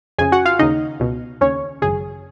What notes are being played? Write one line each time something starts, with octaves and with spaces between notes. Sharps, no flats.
F2 C#3 G#4 G#5
F#4 F#5
F4 F5
D#2 C#3 D#4 D#5
C#2 B2
D#2 C#3 C#4 C#5
G#1 F#2 C#3 G#4